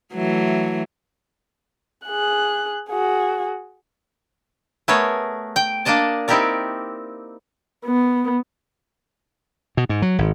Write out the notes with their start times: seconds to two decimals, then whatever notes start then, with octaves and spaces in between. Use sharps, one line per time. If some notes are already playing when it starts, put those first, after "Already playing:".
0.14 E3 F#3 A3
2.06 G#4 F#6
2.89 F#4 G#4
4.88 A3 B3 G#4 A#4 C#5
5.56 G5
5.85 A#3 D4 D5 D#5 A5
6.28 C4 D#4 E4 G4 A#4 D5
7.85 B3
9.77 B2
9.89 G#2
10.02 F#3
10.18 G#1